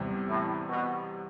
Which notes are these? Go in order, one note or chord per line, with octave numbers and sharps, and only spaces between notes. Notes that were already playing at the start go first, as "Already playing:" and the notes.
Already playing: E2 C3 G3 C4
A2
B2